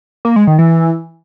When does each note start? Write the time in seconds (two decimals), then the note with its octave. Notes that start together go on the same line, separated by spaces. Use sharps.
0.25 A#3
0.36 G#3
0.47 D#3
0.59 E3